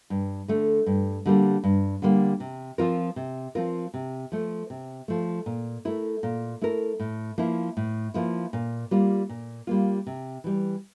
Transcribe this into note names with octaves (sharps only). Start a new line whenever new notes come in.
G2
D3 A3
G2
D3 G3 A#3
G2
D3 G3 A#3
C3
F3 C4 F4 A#4
C3
F3 C4 F4 A#4
C3
F3 A3
C3
F3 A3
A#2
A3 E4 A#4
A#2
A3 E4 A#4
A2
F3 A#3 E4
A2
F3 A#3 E4
A#2
G3 A#3 F4
A#2
G3 A#3 F4
C3
E3 G3